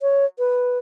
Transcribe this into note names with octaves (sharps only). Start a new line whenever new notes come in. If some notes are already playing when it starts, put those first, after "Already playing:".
C#5
B4